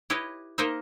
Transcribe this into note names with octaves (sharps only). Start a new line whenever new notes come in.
E4 G4 B4 C#5 D#5
A#3 D#4 A#4 C5 D#5 E5